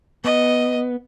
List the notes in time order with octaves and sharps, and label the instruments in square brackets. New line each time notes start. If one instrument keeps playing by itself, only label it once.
[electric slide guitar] B3 [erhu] D#5